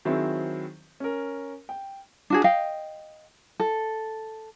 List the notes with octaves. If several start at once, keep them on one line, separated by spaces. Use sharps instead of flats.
D#3 F#3 C4 E4 G#4 C5
C#4 A#4
G5
D4 F#4 G#4
D#5 F5 G5
A4